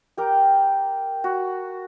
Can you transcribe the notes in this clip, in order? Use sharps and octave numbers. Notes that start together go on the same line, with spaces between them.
G4 A#4 G5
F#4